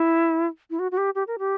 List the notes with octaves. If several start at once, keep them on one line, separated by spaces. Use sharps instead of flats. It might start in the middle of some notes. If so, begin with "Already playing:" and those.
Already playing: E4
E4
F#4
F#4
G4
G4
A#4
G4